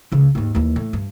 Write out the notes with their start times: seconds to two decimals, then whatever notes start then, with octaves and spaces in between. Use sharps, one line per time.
0.12 C#2 C#3
0.35 D#2 G#2
0.55 D#2 E3
0.76 A2
0.93 G2